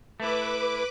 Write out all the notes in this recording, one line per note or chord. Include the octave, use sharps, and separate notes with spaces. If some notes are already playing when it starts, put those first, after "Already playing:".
A3 E4 B4 D6